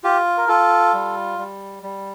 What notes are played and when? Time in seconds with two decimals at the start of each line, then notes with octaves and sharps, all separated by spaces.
0.04 F4 G4
0.37 A#4
0.48 F4 A4
0.94 G3
1.38 G3
1.83 G3